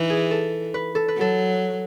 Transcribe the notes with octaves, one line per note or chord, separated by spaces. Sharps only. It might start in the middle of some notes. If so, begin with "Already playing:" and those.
Already playing: E3 D#4
G#4
A4
B4
A4
B4
F#3 A4